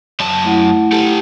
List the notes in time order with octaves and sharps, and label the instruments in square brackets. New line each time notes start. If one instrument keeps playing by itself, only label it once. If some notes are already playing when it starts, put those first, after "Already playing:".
[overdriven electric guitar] F#2 A5
[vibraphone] A3 E4 F#5
[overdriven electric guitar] G4 A4